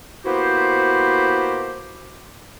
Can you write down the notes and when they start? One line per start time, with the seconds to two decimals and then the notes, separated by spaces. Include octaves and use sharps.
0.25 A#3 B3 E4 F#4 G4 C5